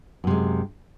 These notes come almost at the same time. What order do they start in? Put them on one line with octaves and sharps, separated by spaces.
F#2 C3 G#3